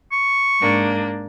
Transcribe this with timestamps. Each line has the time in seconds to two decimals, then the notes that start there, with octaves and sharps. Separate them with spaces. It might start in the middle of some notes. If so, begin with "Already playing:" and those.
0.12 C#6
0.60 G#2 A#3 D4